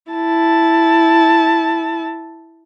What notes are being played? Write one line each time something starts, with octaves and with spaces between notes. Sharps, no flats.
E4 A5